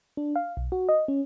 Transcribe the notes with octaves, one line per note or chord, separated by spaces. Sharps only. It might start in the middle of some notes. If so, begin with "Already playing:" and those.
D4
F5
B1
F#4
D#5
C#4